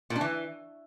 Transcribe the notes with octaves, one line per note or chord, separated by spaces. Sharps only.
A#2
D4
E3